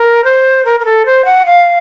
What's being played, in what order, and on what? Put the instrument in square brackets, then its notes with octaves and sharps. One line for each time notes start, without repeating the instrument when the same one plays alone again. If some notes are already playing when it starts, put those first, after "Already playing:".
Already playing: [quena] A#4
C5
A#4
A#4
A4
C5
F#5
F5